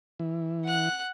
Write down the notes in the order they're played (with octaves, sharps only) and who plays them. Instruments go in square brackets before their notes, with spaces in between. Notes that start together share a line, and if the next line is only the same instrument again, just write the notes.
[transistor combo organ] E3
[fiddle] F#5 F#6